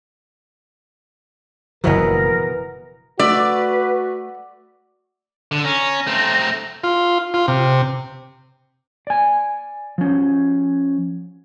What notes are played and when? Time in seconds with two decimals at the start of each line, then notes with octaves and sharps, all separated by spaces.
1.84 F#1 B2 E3 F3 B3 A#4
3.19 A3 F#4 B4 D5
5.52 D3
5.65 C#4 A#5
6.07 A3 C4
6.84 F4
7.34 F4
7.48 C3
9.07 D5 G#5
9.98 F3 C#4